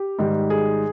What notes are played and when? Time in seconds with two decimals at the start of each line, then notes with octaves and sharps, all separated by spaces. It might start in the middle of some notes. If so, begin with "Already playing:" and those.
Already playing: G4
0.19 G#2 D#3 G3
0.50 G#4